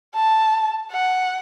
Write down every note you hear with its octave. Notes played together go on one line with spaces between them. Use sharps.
A5
F#5